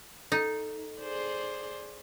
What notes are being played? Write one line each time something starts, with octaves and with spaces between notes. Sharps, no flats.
D#4 A4
G#4 C5 D5